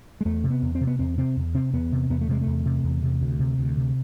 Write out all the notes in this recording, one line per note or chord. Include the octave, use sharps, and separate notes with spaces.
G#3
E2 A3
C3
B3
E2
C4
C3
B3
E2 C4
C3 C4
E2
C3 C4
E2 B3
C3
E2 B3
A3
C3 G#3
A3
E2
C3
E2
C3
D2
C3
D2
C3